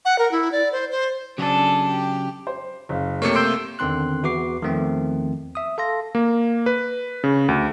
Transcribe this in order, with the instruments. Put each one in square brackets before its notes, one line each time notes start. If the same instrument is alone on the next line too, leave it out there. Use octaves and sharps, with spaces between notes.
[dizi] F#5
A#4
E4
D5
C5
C5
[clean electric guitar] C#3 F#3 [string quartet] D4 G#4 A4
[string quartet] G4
[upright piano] C5
F#1 F5
[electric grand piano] C3 A3 A#3 [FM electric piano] C#5 C#7
[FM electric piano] C6 E6 G6 [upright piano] D7
[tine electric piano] E2 D3 D#3 C4 C6 F#6
E2 F#4 B4 D6 C7
E2 D#3 F3 A3 C4
E5 D#6
A4 F5 C6 A#6
[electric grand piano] A#3
B4
C#3
D2